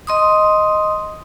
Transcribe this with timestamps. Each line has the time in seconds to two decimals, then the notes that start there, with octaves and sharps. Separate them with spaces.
0.07 D#5 C6 D#6